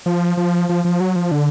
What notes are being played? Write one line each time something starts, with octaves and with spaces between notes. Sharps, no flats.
F3
F3
F3
F3
F#3
F3
D3